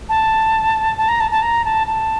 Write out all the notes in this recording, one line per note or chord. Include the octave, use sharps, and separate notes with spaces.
A5
A5
A#5
A5
A5
A#5
A5
A5